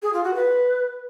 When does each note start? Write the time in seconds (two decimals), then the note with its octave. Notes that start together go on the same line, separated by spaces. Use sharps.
0.02 G#4
0.13 F4
0.24 F#4
0.34 B4